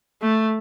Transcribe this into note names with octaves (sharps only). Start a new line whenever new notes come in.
A3